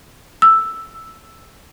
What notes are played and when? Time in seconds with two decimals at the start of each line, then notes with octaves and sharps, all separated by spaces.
0.42 E6